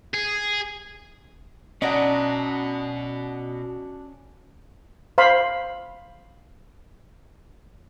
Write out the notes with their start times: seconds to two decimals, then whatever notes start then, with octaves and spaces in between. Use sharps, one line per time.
0.14 G#4
1.82 B2 F#3 C#4 D4 D#5 F#5 A#5
5.18 C5 F5 B5 C6